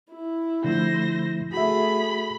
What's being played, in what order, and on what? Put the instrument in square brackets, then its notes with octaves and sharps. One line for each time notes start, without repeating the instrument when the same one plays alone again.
[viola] E4
[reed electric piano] D3 F3 A3 [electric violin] C5 A#6
[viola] A3 G#4 [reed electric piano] F#4 E5 [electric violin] B5